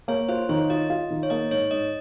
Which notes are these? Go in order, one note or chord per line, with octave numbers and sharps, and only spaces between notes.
A#3 C#5
F4 C5
D#3 C#5
F4 D#5
F4
D#3
C#5
A#3 D#5
G#2 C#5
G#2 D#5